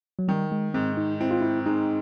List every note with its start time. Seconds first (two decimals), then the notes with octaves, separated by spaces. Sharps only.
0.19 F#3
0.28 D#3 G3
0.52 G#3
0.74 G#2 C4
0.97 D#4
1.21 C4 E4
1.31 F4
1.41 E4
1.66 G#3 D#4